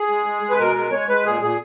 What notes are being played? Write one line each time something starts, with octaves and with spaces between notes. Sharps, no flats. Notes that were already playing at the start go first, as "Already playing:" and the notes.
Already playing: G#4
G#3
G#3
G#3
B4
B2 A#4
G#3 A#4
G#3 C#5
G#3 B4
A#2 G#4
A#2 G#4